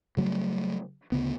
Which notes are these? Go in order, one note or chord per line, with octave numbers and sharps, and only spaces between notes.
C#3 F#3 G3 A3
D2 C#3 B3